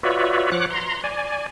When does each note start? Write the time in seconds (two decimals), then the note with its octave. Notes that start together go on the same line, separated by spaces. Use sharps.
0.03 F4 F#4 B4 C#5 D5 E5
0.52 F3 C#5 F#5 D6 F#6
0.70 A#5 C6
1.04 D5 G#5